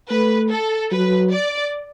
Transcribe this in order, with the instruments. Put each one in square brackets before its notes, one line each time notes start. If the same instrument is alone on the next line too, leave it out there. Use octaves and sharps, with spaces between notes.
[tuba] A3 [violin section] B4
[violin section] A4
[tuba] F#3 [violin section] B4
[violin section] D5